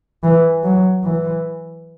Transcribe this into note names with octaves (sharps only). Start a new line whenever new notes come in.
E3
F#3
E3